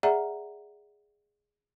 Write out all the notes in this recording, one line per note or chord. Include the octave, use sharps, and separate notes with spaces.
G#4 D5 E5 F#5 A#5